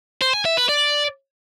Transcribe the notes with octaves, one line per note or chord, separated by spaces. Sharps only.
C5
G#5
E5
B4
D5